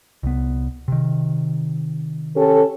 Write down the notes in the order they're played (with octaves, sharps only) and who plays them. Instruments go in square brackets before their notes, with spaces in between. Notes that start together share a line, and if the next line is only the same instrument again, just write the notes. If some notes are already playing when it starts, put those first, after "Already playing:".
[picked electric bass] C2 B3
C3 D#3
[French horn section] C#4 G4 A4